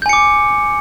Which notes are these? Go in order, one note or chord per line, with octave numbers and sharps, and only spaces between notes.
G#5 D6 G6 C#7